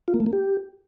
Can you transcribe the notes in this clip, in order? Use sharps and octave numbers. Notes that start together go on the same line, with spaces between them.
F4
A#3
A3
A#3
G4